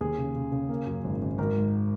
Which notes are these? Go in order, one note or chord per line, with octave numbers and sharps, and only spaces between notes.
D#2 G#4
C#3
C#3
C#3
A#3
F#2
G#1
G#1
G#1 A#4
G#2